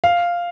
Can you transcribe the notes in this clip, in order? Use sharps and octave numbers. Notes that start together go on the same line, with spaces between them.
F5